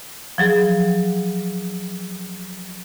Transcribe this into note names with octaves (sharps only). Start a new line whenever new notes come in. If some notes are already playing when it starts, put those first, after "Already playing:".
F3 F#3 G#4